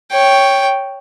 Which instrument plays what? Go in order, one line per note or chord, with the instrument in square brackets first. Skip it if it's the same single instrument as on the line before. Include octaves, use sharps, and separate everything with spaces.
[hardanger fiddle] C#5 G5